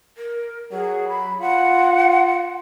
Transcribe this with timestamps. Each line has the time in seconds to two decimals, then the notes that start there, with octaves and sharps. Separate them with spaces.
0.17 A#4
0.72 F#3 G#4
1.09 B5
1.41 F4 F#5